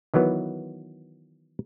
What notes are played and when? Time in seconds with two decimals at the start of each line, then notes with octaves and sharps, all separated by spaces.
0.14 D#3 E3 F#3 B3